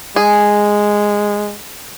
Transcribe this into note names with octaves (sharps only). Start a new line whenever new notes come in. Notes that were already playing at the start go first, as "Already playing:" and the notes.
G#3 G#4